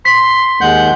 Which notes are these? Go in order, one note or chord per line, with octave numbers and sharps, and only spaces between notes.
C6 B6
D#2 G#3 F#5 G6